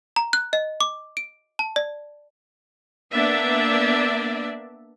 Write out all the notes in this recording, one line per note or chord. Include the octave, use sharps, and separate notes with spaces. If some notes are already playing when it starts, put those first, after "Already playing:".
A#5
F#6
D#5
D6
D7
A5
D5
A#3 B3 D4 D5 E5